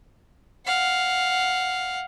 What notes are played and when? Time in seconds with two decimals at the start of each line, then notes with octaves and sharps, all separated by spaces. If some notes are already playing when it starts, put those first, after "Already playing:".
0.66 F5 F#5